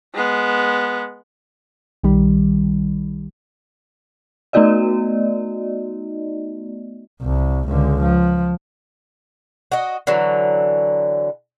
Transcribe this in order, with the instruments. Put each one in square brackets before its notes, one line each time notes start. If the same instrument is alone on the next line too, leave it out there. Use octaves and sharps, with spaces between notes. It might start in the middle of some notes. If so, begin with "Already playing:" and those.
[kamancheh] G#3 B3
[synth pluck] B1 D#3 G3
[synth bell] A3 B3 D#4 F#4 D5 D#5
[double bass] C2
C#2 D3
F3
[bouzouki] F#4 D#5
D3 E3 F#3